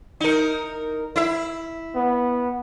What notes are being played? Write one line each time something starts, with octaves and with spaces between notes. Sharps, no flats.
D#4 A#4
E4 E5
B3